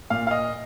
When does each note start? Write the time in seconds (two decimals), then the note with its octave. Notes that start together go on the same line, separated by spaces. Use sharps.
0.10 A#2 F5
0.27 F5
0.31 D#5